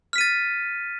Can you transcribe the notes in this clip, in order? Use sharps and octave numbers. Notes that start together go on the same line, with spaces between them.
F6 A6 B6 D#7